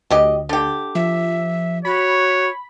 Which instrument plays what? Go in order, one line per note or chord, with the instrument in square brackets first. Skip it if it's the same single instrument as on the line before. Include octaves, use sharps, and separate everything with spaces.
[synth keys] D2 [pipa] F#3 G4 D#5
[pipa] D3 G4
[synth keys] F3 [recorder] E5
[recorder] F#4 [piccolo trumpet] C#5 [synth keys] B5